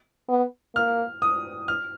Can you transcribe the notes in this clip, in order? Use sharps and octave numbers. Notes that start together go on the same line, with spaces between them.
B3
A#3 F6
D#6
F6